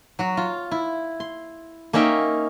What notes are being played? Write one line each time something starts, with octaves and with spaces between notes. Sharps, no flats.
F#3 F#4
F4
E4
C6
A#3 C#4 D#4 E5 G5